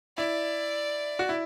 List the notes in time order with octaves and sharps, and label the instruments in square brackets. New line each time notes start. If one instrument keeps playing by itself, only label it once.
[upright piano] E4 [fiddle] D5
[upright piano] F#4
E4